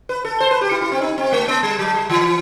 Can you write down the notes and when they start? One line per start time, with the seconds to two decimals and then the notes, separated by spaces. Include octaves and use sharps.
0.09 B4
0.25 A4
0.40 C5
0.51 B4
0.61 G4
0.71 E4
0.81 E4
0.92 C4
1.01 D#4
1.18 C4
1.33 A3
1.48 B3
1.63 G3
1.79 F#3
1.94 G3
2.10 E3